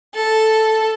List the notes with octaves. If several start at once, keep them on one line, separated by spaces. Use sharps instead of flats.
A4